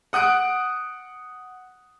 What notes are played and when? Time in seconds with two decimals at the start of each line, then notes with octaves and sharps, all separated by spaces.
0.13 F#5 D#6 F#6 D7